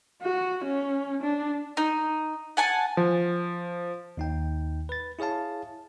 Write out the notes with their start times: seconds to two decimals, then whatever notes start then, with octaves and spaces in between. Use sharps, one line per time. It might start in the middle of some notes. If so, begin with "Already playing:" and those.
0.22 F#4
0.64 C#4
1.23 D4
1.77 D#4
2.57 F#5 G#5 A5
2.97 F3
4.17 D#2 D#4 G5
4.89 B4 A6
5.19 E4 G#4 C#5 F5 A5